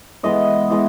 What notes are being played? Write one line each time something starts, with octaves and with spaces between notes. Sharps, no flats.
E3 G#3 B3 D#5
E3 G#3 B3